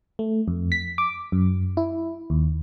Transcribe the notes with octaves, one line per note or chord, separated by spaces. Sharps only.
A3
F2
B6
D6
F#2
E4
D#2